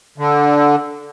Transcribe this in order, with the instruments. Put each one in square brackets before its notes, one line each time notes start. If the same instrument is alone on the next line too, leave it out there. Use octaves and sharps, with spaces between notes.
[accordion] D3